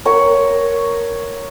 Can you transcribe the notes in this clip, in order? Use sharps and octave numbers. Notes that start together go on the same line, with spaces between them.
A#4 C#5 F#5